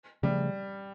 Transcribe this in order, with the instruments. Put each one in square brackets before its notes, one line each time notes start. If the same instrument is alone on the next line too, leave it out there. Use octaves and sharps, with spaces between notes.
[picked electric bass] C#3 F3 A3 [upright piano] G3